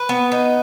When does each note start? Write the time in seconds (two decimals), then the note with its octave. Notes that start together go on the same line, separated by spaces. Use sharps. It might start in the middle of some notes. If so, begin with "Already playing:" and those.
Already playing: B4
0.09 B3
0.32 D#4